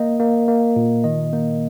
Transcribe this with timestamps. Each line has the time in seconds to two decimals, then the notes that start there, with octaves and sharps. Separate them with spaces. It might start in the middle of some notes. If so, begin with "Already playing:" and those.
Already playing: A#3 D#5
0.20 A#3
0.48 A#3
0.76 A#2
1.04 D#3 D#5
1.33 A#3